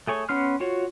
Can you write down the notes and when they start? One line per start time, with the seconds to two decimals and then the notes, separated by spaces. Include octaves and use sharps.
0.07 A3 G#4 C#5
0.29 B3 C#4 C6 F6
0.60 F4 F#4 C#5